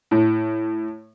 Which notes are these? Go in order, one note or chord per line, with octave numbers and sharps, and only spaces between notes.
A2